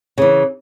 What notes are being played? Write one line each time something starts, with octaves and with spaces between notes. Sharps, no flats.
C#3 E3